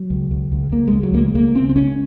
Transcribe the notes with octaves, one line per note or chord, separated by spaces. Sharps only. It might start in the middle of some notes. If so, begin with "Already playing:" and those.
Already playing: F#3
C#2
C#2
C#2
C#2 A#3
C#2 G#3
F#3
C#2 A#3
G#3
C#2 A#3
C#3 C4
C4
C#2 C#4